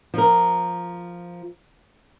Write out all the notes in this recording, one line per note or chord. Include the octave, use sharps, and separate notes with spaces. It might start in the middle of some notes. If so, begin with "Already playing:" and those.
F3 A#4